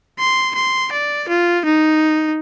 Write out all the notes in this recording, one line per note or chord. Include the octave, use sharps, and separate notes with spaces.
C6
C6
D5
F4
D#4